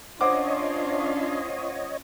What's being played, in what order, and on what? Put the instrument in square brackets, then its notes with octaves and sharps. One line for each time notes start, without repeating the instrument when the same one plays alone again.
[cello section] C#4 F4 [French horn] D4 [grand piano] C5 F#5 D6 [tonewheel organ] C#5 D#5